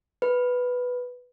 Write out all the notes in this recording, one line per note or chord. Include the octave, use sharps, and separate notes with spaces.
B4